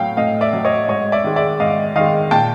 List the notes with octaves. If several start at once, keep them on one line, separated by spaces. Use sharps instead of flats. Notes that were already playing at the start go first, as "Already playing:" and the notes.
Already playing: A2 F#3 F5 G5
A2 D#5 F5
D5 E5
F#3
C#5 D#5
G#2 C#5 D#5
D5 E5
D#3 G#3
D5 E5
G#2 D#5 F5
D#3 G#3 D#5 F5
A#2 G5 A5